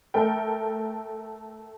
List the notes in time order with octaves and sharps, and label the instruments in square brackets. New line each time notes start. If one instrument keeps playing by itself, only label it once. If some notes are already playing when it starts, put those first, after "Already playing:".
[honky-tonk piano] A3 A4 A#4 G5